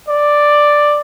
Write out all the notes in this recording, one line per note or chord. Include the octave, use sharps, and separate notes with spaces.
D5